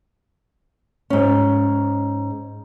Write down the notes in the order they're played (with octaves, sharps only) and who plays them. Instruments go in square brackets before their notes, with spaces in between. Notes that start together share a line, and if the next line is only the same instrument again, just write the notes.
[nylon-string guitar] G#2 C#4